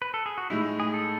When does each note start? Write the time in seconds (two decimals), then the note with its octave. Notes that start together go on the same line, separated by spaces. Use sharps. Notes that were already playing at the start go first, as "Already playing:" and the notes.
0.02 B4
0.14 A4
0.26 G#4
0.38 F#4
0.50 A2 G#3 D#4 E4
0.80 G#4
0.94 A4